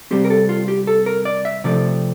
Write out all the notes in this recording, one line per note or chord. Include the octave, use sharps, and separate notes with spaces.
C3 G3 C4 G4
A#4
A4
F4
G4
A4
A#4
D5
E5
C3 F3 A3 C4 D5